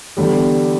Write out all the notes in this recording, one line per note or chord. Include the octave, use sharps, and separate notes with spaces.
E2 D3 G3